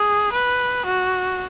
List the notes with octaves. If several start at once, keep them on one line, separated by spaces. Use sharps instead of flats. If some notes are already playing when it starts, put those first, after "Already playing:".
Already playing: G#4
B4
F#4